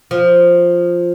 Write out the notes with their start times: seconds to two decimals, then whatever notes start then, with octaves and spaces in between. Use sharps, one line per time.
0.11 F3